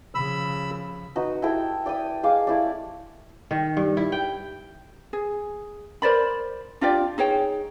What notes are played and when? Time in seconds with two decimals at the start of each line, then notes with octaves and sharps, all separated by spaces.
0.15 C#3 F3 B5 E6
1.16 D#4 F#4 B4
1.42 E4 G4 A4 G5
1.86 D5 G5 B5 D#6
2.23 G#3 F5 D6
2.47 A3 E4 G4 D5
3.51 D#3
3.77 G2
3.97 E4
4.12 G5
5.13 G#4
6.02 A#4 C5 D5 B5
6.81 D4 F4 G4 D5
7.18 D#4 G#4 C#5 G5